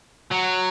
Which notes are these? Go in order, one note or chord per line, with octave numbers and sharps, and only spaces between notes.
F#3